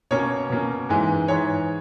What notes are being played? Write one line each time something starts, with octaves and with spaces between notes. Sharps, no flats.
B2 A#3 C#4 C#5
B2 A#3 C#4
G#2 E3 G#3
G#2 E3 G#3 C#5